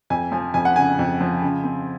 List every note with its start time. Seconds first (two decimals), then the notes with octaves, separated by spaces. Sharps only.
0.10 F2 G#5
0.32 F3 G#5
0.54 F2 G#5
0.65 F#5
0.76 C#3 G#5
0.99 F2
1.20 F3
1.42 C#3
1.64 C4